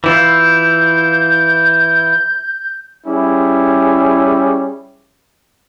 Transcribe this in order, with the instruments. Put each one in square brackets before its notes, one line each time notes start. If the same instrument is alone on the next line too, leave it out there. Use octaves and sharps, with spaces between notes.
[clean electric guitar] E3 E4 F4 [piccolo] G6
[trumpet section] G3 C#4 E4 G#4